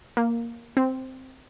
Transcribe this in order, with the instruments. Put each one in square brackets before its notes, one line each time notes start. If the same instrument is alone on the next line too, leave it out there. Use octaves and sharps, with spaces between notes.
[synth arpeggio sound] A#3
C4